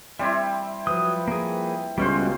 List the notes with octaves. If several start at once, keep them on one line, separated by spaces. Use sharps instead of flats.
G3 C4 E4 E5
F3 F#3 B4 D#6
A#3 G#4
C#2 B2 G3 C#4 F#4 C5